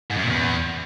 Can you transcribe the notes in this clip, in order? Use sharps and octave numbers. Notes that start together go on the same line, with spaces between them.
G#2
F#2
A#2
E2